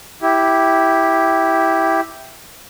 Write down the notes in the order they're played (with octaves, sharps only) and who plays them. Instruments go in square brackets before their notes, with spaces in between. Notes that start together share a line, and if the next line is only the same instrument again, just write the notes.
[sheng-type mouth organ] E4 G4